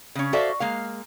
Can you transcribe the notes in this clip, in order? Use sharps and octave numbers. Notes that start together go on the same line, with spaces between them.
C#3 C#4
F#4 A4 C5 D5 E5 F5
G#3 A#3 F5